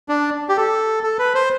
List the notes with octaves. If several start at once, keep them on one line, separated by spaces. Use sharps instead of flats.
D4
G4
A4
A4
B4
C5